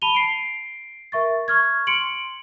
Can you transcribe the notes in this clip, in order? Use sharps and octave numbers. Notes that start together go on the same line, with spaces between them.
A5 B5 D#7 F7 G7
C7 D7
A#4 E5 C#6 A6
C#6 F6 G#6
C6 C#7 D7 F#7